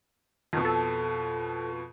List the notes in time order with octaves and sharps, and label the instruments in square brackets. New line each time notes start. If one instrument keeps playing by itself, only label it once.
[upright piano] F2 B2 [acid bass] D#3
[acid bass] A4